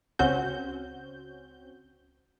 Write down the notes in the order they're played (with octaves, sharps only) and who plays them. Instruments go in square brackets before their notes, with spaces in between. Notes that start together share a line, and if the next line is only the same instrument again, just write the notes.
[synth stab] C#2 C4 C#4 F#4 G6